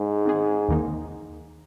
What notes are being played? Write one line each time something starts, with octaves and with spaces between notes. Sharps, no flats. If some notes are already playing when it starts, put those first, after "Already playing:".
Already playing: G#2
D#3 C4 G#4
D#2 D#3 A#3 D#4